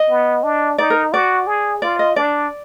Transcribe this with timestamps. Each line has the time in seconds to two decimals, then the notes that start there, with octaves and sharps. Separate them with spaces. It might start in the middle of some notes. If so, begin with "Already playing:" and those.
Already playing: D#5
0.10 B3
0.44 D4
0.78 D#4 D5
0.90 A#4
1.13 F#4 D5
1.47 G#4
1.82 F4 D5
1.99 D#5
2.16 D4 D5